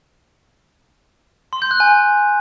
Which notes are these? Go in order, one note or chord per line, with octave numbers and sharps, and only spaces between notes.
C6
G6
F#6
G#5